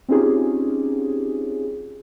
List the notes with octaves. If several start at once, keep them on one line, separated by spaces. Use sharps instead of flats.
C4 C#4 D#4 F4 G4 G#4